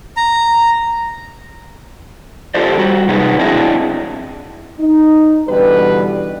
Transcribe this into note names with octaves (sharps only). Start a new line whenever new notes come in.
A#5
F4 G4 A4 C5 D5
G3 F#4
C3 D#4 F#4 G#4 B4
C4 D4 E4 G#4 D#5 E5
D#4
B2 D3 E3 G3 B4